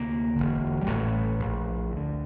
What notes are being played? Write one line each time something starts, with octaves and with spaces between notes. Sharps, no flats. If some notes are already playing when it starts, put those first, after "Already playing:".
Already playing: D2 C3 A#3
E1 E2 D3
G3
A1 A2 A3
A#1 A2
D2 D3